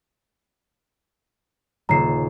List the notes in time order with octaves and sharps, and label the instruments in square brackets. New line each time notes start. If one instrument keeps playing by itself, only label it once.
[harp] D#1 C#3 E7 [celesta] A#5 C7